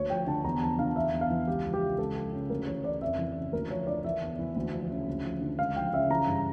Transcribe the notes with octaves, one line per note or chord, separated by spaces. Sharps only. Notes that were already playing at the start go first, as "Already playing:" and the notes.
Already playing: D2 C#5
F3 G5
D3 A5
E2 A#5
F3 A5
D3 F5
E3 E5
E2
F5
E3
C#2 G4
F3
G4
C#3
C#2 A4
F3
C#3
D2 A#4
E3 C#5
C#3 D5
F2 E5
E3
C#3
D2 A#4
F3 C#5
D3 D5
E3 E5
E2
E3
D2
F3
C#3
D2
F3
D3
C#2 F5
F3 G5
C#3 E5
E3 A#5
G2